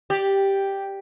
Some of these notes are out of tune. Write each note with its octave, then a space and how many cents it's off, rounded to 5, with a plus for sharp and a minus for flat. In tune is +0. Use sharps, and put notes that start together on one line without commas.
G4 +0 D5 +0